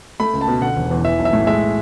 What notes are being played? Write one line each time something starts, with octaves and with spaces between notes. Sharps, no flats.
A3 B5
C#2
A5
B2
D3 F#5
E1
E2
E3 E5
B1
E5
A2
G#3 E5